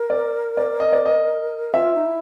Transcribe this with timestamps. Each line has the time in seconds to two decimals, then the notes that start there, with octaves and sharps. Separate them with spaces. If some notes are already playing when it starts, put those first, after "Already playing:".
Already playing: A#4
0.10 D5
0.57 D5
0.80 D#5
0.93 D5
1.06 D#5
1.74 F4 E5
1.95 D#4
2.06 E4